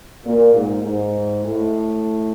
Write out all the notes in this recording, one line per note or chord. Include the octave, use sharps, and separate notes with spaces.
A#2
G#2
G#2
A2